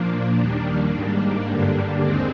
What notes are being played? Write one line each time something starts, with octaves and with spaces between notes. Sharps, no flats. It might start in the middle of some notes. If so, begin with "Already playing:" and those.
Already playing: A#2 F3 A#3 D4
D#2 D#3 G3
G#2 G3
G2 D3 G3
D#2 G#3 C4